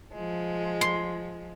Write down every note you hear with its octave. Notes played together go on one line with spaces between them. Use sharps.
F3 G#3
C6